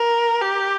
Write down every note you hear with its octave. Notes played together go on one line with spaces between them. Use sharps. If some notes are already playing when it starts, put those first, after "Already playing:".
Already playing: A#4
G4